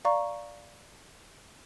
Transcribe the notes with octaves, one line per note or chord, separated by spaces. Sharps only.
D5 F5 A#5 C#6